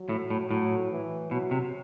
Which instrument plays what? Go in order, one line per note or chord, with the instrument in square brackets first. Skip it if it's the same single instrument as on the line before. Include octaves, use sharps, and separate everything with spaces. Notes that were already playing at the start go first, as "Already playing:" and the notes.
Already playing: [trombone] F#3
[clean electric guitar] A2
A2
[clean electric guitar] A2 [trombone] F#3
[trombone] E3
[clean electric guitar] B2 [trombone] F#3
[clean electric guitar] C3